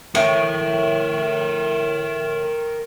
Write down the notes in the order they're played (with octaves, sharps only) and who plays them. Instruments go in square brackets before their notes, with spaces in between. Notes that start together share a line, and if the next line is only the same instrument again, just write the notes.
[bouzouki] A2 [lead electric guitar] A#4 G5